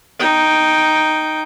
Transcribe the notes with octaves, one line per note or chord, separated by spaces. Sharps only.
D#4 G5